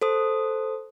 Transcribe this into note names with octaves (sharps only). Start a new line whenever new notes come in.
A4 C5 D#6